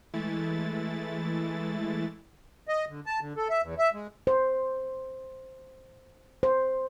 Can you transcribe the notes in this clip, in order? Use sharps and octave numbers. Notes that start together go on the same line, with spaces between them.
E3 G#3 A3 E4 A6
D#5
D3
A5
D3
A4
E5
E2
E5
G#3
C5
C5